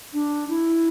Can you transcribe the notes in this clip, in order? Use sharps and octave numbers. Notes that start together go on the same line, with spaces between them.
D4
E4